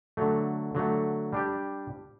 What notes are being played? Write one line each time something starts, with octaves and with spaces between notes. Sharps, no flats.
D3 F#3 A3
D3 F#3 A3
G3 D4 G4